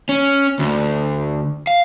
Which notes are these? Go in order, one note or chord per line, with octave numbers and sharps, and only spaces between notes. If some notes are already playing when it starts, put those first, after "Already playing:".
C#4
D2
F5